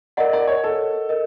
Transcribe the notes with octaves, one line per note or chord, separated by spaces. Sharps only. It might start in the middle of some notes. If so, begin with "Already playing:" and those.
A#4 D5 D#5 F#5
D5
C#5
A4
A#4 D#5